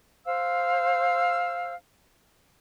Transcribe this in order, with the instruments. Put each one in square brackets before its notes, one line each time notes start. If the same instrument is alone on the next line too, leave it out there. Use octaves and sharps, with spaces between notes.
[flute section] C5 F5 E6